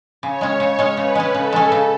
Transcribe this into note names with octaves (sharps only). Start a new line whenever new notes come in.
C#3 C#5
G#3 C#4
C#3
G#3 C#4
C#3 B4
G#3 C#4
C#3 A4
G#3 C#4
C#3